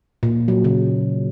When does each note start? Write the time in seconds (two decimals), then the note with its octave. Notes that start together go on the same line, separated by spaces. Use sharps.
0.23 A#2
0.48 F#3
0.64 C#3